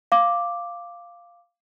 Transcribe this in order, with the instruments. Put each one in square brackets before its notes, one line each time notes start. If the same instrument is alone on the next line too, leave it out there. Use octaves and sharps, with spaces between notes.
[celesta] F5 D6